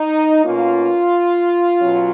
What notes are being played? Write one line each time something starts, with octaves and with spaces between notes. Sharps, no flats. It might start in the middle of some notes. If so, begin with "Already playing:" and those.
Already playing: D#4
B2 A#3 C#4 F4
B2 F#3 C#4